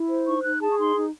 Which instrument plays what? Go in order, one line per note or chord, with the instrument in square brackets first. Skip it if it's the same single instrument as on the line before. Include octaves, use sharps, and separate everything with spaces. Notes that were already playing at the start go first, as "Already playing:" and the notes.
Already playing: [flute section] E4
C5
D#4 C#6
D#4 F#6
G#4 A5
C#6
D#4 C6
D#4